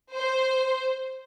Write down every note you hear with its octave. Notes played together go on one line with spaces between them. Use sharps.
C5